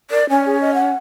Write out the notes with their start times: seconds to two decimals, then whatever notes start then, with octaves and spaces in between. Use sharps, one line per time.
0.11 A#4 D5
0.30 C#4 G#5
0.46 G#4
0.61 D#5
0.74 F#5